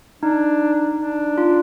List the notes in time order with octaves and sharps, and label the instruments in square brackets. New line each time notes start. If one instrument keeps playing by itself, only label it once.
[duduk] D4 [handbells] D#4
[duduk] D4
[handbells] F4